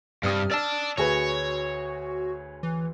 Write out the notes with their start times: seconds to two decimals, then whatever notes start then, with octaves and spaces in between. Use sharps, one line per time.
0.23 G2 C3 G3 D#6 F6
0.52 D5 A5 E6
0.98 D2 F#4 G#4 B4 C#5
2.63 E3